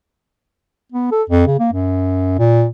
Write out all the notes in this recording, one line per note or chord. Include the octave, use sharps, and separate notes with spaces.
B3
A4
F2
C#3
A#3
F#2
A#2